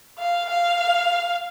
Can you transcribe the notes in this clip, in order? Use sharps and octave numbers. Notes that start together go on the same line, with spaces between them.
F5
F5